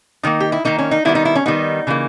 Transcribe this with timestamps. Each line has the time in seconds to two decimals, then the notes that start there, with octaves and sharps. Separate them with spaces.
0.23 D#3 A#3 D#4
0.40 G4
0.52 E4
0.65 D#3 A#3 D#4
0.79 C#4
0.91 D#4
1.05 D#3 G3 B3 E4
1.15 D#4
1.25 E4
1.35 C#4
1.46 D#3 G3 B3 D#4
1.87 C#3 E3 A#3